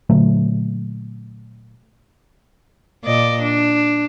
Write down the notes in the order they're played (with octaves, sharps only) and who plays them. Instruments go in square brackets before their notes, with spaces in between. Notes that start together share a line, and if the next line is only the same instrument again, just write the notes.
[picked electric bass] A#2 D3 F#3 A3
[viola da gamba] A#2 D5 D#5
D4